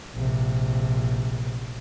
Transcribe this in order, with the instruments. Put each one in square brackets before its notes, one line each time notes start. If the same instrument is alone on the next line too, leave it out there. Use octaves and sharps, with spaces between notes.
[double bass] A#1 C3